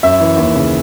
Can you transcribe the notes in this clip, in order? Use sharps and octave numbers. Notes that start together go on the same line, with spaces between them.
F#2 E5
E3
D#2
C#3